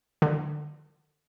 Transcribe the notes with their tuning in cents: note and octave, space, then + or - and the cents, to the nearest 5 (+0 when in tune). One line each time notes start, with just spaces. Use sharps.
D3 +25